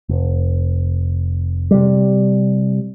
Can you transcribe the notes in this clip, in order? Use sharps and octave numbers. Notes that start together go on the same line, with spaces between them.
F1
C3 G3